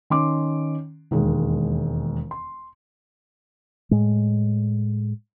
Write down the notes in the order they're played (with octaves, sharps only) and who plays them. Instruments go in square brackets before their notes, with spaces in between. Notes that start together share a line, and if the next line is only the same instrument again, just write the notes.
[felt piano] D#3 C#4 C6 D6
E1 D#2 G#3
C6
[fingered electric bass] A2 G#3